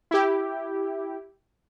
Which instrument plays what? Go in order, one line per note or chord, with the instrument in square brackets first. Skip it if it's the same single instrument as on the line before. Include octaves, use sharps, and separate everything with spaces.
[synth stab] E4 G4